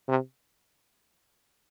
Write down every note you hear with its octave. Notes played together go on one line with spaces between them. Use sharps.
C3